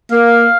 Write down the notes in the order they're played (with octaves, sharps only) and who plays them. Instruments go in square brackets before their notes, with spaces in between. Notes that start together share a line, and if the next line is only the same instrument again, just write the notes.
[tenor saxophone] A#3 [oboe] F5